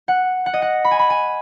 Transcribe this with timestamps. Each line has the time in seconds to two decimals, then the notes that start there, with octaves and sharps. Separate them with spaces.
0.08 F#5
0.46 F#5
0.53 D#5
0.62 F#5
0.84 B5
0.91 G#5
0.99 B5
1.10 G#5